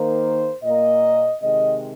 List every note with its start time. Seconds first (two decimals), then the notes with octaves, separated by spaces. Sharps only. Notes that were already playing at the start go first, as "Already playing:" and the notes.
Already playing: D#3 A#3 C5
0.63 A#2 A#3 D#5
1.41 C3 D#3 G#3 D#5